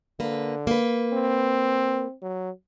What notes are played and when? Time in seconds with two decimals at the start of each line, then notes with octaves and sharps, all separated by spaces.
0.20 D3 A#3 B4
0.67 A#3 B4
1.13 C4
2.22 F#3